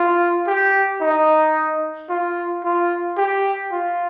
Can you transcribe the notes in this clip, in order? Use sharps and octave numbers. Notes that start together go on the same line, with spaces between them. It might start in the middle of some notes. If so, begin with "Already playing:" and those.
Already playing: F4
G4
D#4
F4
F4
G4
F4